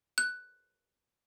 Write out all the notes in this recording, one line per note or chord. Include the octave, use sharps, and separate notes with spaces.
F#6